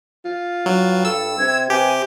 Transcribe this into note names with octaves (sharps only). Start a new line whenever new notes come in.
F4
G2 F#3
A4 E6
C3 G#6
C3 G4 B4 G#5